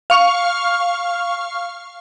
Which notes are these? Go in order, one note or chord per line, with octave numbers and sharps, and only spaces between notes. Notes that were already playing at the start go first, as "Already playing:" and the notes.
F5 C#6 F6